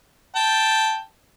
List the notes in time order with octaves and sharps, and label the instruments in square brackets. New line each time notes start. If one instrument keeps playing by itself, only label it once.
[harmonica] G5 A5